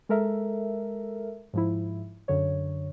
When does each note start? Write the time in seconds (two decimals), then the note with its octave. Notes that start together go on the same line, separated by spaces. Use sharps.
0.09 G#3 A4 A#4 E5
1.53 G#2 F3 E4
2.28 F#2 D3 C#5